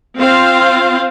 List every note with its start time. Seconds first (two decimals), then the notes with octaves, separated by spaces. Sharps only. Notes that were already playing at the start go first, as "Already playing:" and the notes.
0.18 C4 F4 F5